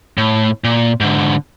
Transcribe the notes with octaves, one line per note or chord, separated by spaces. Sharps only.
A2
A#2
G#2 D3